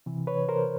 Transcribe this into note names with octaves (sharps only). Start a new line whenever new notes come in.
C3 E3
B4 C#5
A#4 C5